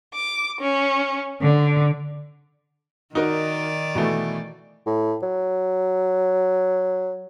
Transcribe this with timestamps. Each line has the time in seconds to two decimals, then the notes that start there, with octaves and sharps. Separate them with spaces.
0.15 D6
0.61 C#4
1.41 D3
3.15 D#3 D#4 F#4 A#4 D5
3.95 B2 E3 A3
4.86 A2
5.23 F#3